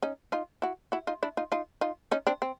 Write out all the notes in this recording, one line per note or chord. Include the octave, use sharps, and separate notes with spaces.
C#4 D#4
D#4 F4
E4 F#4
E4 F#4
D#4 F4
D4 E4
D#4 F4
D#4 F4
D#4 F4
C#4 D#4
C4 D4
C4